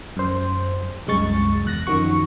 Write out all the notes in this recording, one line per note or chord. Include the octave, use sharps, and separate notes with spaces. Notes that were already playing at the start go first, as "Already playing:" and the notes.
F#2 C5
C2 F#2 G#3 C#6 A6
E2 F#6 A#6
F#2 D#3 F3 F#4 C#6